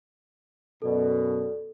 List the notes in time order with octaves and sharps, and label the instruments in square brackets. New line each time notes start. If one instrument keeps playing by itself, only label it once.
[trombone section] F#2 B2 [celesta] A4 D5